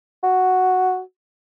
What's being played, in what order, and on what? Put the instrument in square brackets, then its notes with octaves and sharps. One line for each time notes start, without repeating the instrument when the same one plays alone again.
[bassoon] F#4